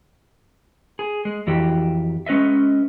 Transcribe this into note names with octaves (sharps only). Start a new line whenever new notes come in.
G#4
G#3
F2 E3 F#4 G4
G#3 C#4 B4 D#5 E5